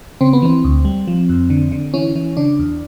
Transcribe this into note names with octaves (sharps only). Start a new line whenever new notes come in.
C#3 C4
B3
E3 C4
D2
G3
F3
F2
D3
D3
E3 C#4
E3
C#3 D4
E2